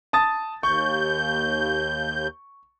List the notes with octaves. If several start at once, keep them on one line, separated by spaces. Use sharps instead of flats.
A5 D#6 A6
D#2 C#6 G6